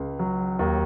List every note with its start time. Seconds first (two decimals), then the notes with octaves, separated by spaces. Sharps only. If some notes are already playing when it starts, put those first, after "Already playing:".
Already playing: C#2
0.19 F#3
0.59 D#2